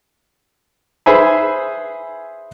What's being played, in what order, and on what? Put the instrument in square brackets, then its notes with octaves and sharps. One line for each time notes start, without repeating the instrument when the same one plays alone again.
[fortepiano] G#4 B4 C5 E5 G#5 B5